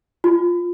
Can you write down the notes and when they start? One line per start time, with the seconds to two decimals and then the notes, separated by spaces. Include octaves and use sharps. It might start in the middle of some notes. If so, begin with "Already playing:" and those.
0.24 F4